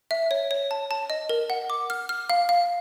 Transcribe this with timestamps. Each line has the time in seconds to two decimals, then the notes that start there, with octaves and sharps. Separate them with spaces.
0.11 E5
0.31 C#5
0.51 C#5
0.71 A5
0.91 A5
1.10 D#5
1.29 A#4
1.50 F#5
1.70 D6
1.90 F6
2.09 F6
2.30 F5
2.49 F5